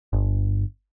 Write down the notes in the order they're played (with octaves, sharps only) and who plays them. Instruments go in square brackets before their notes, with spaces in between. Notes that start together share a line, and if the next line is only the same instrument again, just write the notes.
[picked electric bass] G1